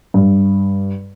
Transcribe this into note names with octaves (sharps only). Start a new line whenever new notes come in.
G2